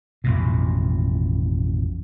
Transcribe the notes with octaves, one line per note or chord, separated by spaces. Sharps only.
A1 F2 B2